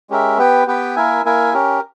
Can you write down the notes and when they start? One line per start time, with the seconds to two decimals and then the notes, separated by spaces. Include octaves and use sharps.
0.10 G#3 C#4 G4 A#4 E5
0.38 B3 G4 B4 G5
0.67 B3 G4 B4 G5
0.96 A#3 E4 A#4 E5 G#5
1.25 A#3 E4 A#4 E5 G#5
1.53 C#4 G4 A#4